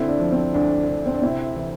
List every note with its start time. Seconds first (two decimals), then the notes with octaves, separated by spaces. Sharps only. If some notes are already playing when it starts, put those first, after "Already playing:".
Already playing: D3 C4 E4
0.09 D4
0.19 F3
0.32 C4
0.54 D2 D4
0.88 D2
1.06 C4
1.14 D4
1.22 C3 C4 E4
1.56 E3